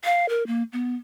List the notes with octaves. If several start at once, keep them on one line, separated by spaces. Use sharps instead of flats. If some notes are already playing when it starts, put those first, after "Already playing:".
F5
A#4
A#3
B3